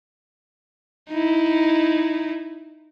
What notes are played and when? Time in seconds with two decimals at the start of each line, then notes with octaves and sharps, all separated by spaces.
1.10 D#4 E4